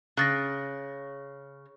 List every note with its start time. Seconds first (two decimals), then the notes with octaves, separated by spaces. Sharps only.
0.17 C#3 F#6 A6 A#6